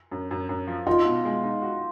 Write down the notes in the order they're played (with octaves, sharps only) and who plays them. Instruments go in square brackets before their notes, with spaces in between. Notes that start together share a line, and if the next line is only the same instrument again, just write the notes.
[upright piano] F#2
F#2
F#2
F3
[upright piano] D#4 [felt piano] F4
[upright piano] B2
G#3
D#4
F#4